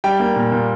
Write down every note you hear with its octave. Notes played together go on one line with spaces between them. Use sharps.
G3 G5
A#3
A#2
A#2